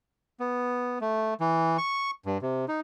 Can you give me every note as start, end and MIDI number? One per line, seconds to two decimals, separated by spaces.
0.40 0.99 59
1.01 1.34 57
1.40 1.77 52
1.78 2.11 85
2.26 2.38 43
2.42 2.65 48
2.68 2.80 63